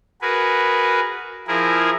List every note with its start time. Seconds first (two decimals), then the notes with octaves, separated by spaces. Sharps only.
0.22 F#4 G#4 A#4 B4
1.48 F3 E4 G#4 A#4